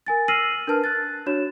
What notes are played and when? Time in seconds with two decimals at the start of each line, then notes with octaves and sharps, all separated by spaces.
0.06 A#4 G#5 A6
0.28 E6 F6 A#6 C7 D#7 F#7
0.67 D4 A#4 B4 A5 F6
0.84 F#6 A6
1.26 D4 F#4 C#5 E7